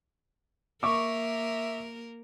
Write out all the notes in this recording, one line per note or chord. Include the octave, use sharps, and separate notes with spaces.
A#3 A#4 E5 C#6 D6